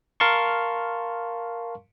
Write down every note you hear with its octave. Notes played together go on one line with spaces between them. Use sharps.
A#4 F5 A5 C6 C#6